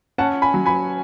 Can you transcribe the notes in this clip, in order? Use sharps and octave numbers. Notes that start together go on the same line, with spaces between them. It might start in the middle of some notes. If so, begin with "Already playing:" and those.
C#4 F#5 A5
G#5 B5
F#3
G#5 B5